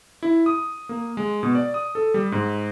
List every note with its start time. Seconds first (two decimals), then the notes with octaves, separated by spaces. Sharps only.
0.23 E4
0.46 D#6
0.89 A#3
1.17 G#3
1.43 B2
1.55 D5
1.74 D#6
1.95 A4
2.14 G3
2.32 G#2